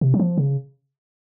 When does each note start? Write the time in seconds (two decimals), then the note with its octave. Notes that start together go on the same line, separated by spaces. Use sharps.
0.01 C3
0.14 F#3
0.20 F3
0.38 C#3